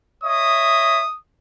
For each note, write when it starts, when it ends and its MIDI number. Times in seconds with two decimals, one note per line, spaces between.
0.24 1.03 73
0.24 1.03 75
0.24 1.03 76
0.24 1.17 87